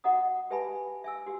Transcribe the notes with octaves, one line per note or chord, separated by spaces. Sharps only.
F#4 D#5 F#5 A#5 D#6
G4 B4 E5 G#5 A5 B5
E5 G#5 E6
F#4 G4